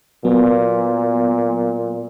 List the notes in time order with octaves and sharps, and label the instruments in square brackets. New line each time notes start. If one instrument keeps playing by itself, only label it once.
[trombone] A#2 [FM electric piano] F#3 B3